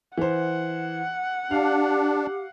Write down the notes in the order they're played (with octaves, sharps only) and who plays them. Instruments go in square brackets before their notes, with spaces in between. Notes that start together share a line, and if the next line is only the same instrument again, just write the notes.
[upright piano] E3 C5 [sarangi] F#5
[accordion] D4 [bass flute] G4 [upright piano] F5